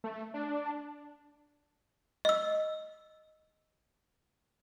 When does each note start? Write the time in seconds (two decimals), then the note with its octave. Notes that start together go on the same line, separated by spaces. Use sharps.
0.04 A3
0.34 D4
2.25 D#5 E6